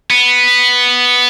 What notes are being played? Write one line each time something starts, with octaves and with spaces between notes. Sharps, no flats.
B3